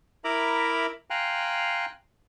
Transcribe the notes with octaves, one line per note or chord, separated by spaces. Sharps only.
E4 A#4 E5 A#5 B5 D6
F5 G5 G#5 A#5 C6 F#6